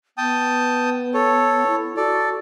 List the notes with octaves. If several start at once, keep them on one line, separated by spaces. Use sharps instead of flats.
B3 G5 A5 D#6
A4 C#5
E4
F#4 A4 D5